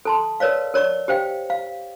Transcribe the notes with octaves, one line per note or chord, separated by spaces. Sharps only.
A4 A5 C6
A#4 B4 C#5 D5 F5
A#4 C#5 D5 C#6
G4 C5 F5 G5
F5